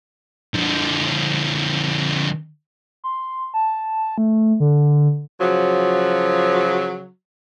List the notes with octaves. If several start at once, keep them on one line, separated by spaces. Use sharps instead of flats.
D3 F3
C6
A5
A3
D3
C#3 F3 F#3